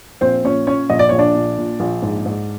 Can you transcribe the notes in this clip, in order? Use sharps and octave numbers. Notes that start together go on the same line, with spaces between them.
A#1 C4 C5
A#2 C#4 C#5
A#2 C#4 C#5
A#1 D#5
D5
A#1 C#5
D4 D5
A#2
A#2
A#1
G#2
G#2